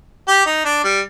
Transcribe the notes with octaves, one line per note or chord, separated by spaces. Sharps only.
G4
D#4
D4
G3